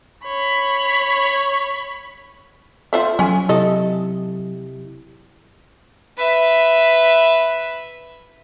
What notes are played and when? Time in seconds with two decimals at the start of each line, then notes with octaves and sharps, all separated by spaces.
0.24 C#5 B5
2.93 F4 A4 C5 E5
3.19 F#3 C#4 G#5
3.49 C3 E4 G4 A4 D#5
6.17 B4 E5